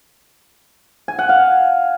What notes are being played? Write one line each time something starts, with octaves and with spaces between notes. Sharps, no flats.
G#5
F#5
F5